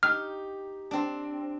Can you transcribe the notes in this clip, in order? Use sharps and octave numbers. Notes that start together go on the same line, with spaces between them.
D#4 G4 F6
C4 D4